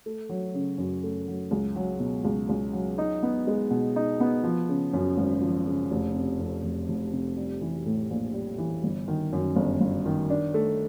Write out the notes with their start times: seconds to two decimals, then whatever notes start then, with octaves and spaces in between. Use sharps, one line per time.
0.06 A3
0.29 F#3
0.54 C#3
0.78 F#2
1.04 A3
1.28 F#3
1.51 C#2
1.76 F#3
2.00 B2
2.25 C#2
2.49 C#2
2.73 F#3
2.98 D#4
3.23 B3
3.47 G#3
3.71 B2
3.96 D#4
4.20 B3
4.44 F3
4.69 C#3
4.93 F#2
5.17 G#1
5.41 F3
5.67 C#3
5.91 F1
6.15 C3
6.40 F2
6.63 F1
6.88 F1
7.13 C3
7.37 G3
7.61 E3
7.86 A2
8.10 A#1
8.34 G3
8.58 E3
8.84 G1
9.08 D#3
9.33 F#2
9.56 G1
9.80 G1
10.06 D#3
10.30 D4
10.54 A3